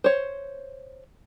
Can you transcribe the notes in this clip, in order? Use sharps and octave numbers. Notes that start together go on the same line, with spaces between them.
C5 C#5